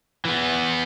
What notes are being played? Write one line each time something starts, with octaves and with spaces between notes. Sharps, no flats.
E3 B3